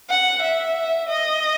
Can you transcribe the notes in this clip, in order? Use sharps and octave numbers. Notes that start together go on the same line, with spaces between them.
F#5
E5
D#5